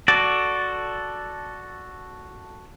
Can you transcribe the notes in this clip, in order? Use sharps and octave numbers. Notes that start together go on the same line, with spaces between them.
F#4 A4 D5